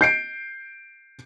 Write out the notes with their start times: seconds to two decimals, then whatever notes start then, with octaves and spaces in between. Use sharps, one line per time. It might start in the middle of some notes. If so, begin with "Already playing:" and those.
0.01 G6 C7 D7